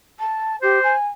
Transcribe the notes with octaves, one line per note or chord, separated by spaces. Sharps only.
A5
G4 C5
G#5